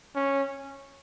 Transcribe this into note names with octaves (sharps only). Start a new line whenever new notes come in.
C#4